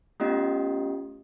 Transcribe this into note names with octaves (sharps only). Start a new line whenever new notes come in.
A3 B3 C#4 F4 G4 D#5